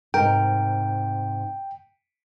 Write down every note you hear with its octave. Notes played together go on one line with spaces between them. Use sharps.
G#2 C3 A#4 G5